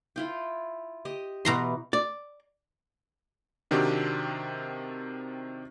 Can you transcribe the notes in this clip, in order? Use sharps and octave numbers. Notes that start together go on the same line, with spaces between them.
E4 F4 G5
G4 D#5
B2 E3 A#5 C6
D5
C3 D#3 C4 D4 F#4 G4